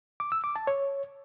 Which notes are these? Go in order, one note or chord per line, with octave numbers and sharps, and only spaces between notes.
D6
E6
D6
A5
C#5